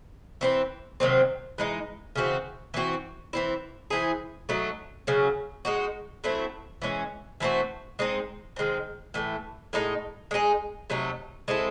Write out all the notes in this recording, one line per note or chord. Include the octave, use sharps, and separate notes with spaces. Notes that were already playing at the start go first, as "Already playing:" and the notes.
E3 C4 E4
C3 D#3 F#3 C4
E3 G#3 D#4
C#3 E3 C4 F#4
E3 C4 F#4
E3 C4 E4
E3 C4 E4 G#4
F#3 A3 D#4
C#3 F#3 C#4
G#3 D#4 F#4
F#3 A3 C4 E4
E3 G#3 C#4
E3 A3 C4 F#4
G#3 C4 D#4
D#3 G#3 C4
A2 E3 A3
A2 G#3 D#4
G#3 D#4 G#4
C3 F#3 A3 D#4
G#3 C4 E4 A4